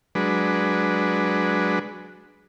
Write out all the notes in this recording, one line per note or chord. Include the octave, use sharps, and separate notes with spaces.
F#3 G#3 D4 B4